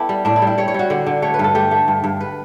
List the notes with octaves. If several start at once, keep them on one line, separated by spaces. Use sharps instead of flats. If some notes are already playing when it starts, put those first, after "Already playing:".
Already playing: B3 E4 G4 A4 B4
G3
A2 D4
E4
G3
E4
G3 C#5
C#5
G3 F#4
D3
D3
A3 C#5
B4
G2 A4
A3 G4
A3
G2
G2
B4